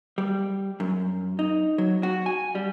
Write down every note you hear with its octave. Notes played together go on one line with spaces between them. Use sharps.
G3
F#2
D#4
F#3
F#4
G#5
G3